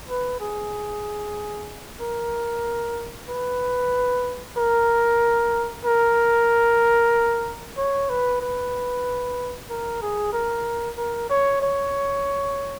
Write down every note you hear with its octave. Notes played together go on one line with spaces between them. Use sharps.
B4
G#4
A#4
B4
A#4
A#4
C#5
B4
B4
A#4
G#4
A#4
A#4
C#5
C#5